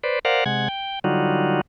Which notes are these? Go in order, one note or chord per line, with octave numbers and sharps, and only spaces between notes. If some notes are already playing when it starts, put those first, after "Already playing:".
B4 C5 D5
A#4 C5 D5 F5 F#5
C3 G#3 F#5 G#6
G5
D3 F#3 G3 D#4 F4 F#4